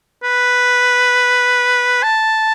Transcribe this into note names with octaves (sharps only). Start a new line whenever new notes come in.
B4
A5